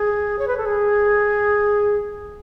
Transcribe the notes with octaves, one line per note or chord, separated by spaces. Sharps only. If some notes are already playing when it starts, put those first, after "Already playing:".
Already playing: G#4
C#5
B4
A4
G#4